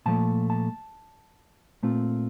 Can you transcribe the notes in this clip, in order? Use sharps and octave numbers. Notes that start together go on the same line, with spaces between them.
A#2 F3 A3 A5
A5
A#2 A3 C4 F4